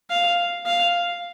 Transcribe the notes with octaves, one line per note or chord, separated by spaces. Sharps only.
F5
F5